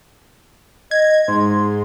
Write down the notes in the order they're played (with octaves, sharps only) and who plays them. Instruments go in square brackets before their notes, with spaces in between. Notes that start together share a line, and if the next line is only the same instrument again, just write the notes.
[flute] D#5 [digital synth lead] G#6
[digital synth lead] G#2 [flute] C6